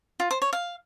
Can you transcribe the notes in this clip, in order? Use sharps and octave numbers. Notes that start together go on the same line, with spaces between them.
F4
C5
C#5
F5